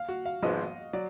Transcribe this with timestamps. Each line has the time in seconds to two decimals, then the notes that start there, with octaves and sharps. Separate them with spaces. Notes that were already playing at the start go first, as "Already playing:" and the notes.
Already playing: F5
0.09 F#4
0.26 F5
0.43 G#1 G#2 F3 G#3 B3 D#5
0.93 F#3 D5